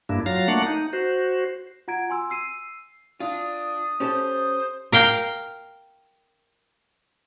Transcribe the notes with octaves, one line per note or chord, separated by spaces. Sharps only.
G2 A#3 D4 E4
F#3 F4 F5 A#5
A3 A#3 D4 F#5
D#4
F#4 C5
F4 F#5 A#5 G#6 D7
G#5 C6 E6
E6 C7 D#7
D4 F4 D#6
C#4 G4 A4 C5
A#4 F5 G5